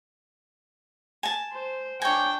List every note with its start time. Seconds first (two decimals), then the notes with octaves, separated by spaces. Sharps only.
1.23 G#5 A5
1.53 C5
2.02 D4 C#5 G5 G#5